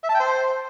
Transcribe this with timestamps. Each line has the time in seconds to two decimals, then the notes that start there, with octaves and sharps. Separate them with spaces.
0.04 E5
0.09 A5
0.14 G5
0.20 C5